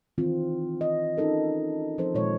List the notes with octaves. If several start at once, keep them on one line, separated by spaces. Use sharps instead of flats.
D#3 E3 C4 F4
D#5
C#4 D#4 A4 A#4
F3 C4 A4 C5
A#2 D#3 G#3 C#5